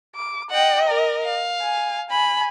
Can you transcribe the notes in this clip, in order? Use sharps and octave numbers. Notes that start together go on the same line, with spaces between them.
D6
D#5 F#5 G5
A#4
F5
G#5
G#5 B5